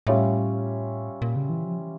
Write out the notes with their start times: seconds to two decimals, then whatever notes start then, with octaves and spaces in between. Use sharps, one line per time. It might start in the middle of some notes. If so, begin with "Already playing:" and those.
0.07 A2 G3 C#4 F4 C#5 E5
1.22 A#2
1.36 C#3
1.50 E3
1.65 F3
1.79 E3